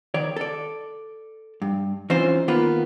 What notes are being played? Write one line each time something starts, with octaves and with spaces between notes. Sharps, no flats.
D#3 C#5 D5
A4 D5
G2
E3 C4 C#4 D#4 F4 C5
D#3 A#3 B3 F4 B4